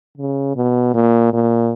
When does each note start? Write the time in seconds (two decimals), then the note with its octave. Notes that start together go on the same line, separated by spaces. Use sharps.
0.18 C#3
0.56 B2
0.94 A#2
1.33 A#2